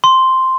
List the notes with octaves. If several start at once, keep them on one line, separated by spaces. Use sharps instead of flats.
C6